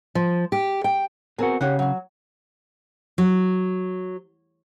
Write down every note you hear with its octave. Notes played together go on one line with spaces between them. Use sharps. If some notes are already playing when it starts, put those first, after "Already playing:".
F3
G4
G5
B3 C4 F#4 G#4 A#4
C#3 G4 C#5 F#5
F#3 F#4
F#3